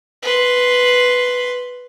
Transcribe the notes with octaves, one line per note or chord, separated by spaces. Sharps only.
B4 C6